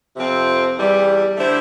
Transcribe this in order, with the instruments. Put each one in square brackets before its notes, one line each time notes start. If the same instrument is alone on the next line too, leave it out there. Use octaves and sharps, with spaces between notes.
[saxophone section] F2 C3 F3 C4
E2 E3 G3
D3 A3 E4 G4 C5